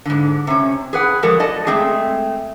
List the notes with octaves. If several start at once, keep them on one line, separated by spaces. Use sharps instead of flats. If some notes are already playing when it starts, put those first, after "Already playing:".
G#2 D3
C3 C#4
G#4 B4 F#5
F3 G#3 F#4 A4 A#4
D5 D#5 A5
G#3 A3 C4 G#4